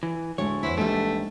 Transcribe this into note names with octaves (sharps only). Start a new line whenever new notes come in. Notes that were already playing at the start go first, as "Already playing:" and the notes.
E3
D2 A2 G#3 C#5
E2 E4 B4 C5
A#1 G#2 E3 G3 A3